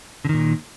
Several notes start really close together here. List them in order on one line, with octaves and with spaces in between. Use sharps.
D3 D#3 A#2